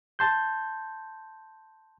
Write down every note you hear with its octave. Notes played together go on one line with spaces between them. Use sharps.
A5 C6 G6